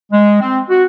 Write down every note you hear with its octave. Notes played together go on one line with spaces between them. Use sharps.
G#3
C4
F#4